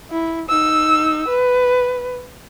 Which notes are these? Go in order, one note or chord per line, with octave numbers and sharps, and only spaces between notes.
E4
D#4 E6
B4